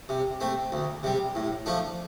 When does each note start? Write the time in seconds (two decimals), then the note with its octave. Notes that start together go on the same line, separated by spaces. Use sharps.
0.09 C3
0.40 A3 C4
0.72 D2
1.03 C3 G3
1.35 A2
1.66 F3 A3 D4